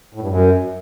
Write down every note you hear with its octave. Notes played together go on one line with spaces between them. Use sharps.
A2
G2
F#2